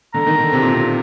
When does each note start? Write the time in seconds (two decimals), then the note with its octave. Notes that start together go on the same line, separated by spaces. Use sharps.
0.14 D3 A#5
0.26 D#3
0.39 D3
0.52 C3
0.62 A#2
0.73 C3